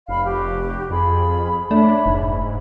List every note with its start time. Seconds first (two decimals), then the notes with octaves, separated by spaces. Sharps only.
0.08 F1 F5 B5 F6
0.25 F#4 G4 G5
0.90 F2 F4 G#4 B5
1.71 A3 D4 C#5 E5 B5
2.06 F1 G#2